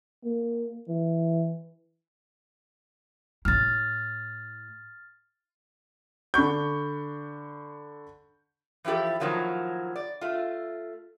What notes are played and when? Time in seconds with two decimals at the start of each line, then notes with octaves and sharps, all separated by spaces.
0.24 A#3
0.88 E3
3.45 A2 E4 F6 A6
6.34 D3 B5 C#6 G6
8.85 E3 F3 E4 G4 A4
9.20 A2 D#3 F3 F#3 A#3
9.96 D5
10.21 A3 F4